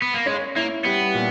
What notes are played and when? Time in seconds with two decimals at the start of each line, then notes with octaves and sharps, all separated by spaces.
0.02 B3
0.14 A#3
0.26 G#3 C#4
0.56 A#3 E4
0.85 G3 B3
1.15 A#2